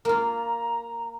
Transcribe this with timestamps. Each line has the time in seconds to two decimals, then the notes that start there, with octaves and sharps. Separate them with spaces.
0.05 A#3 F4 A#5